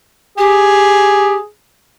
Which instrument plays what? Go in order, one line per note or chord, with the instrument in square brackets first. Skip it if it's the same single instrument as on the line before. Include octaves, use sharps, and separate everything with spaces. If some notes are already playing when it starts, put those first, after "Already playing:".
[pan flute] G4 [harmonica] G#4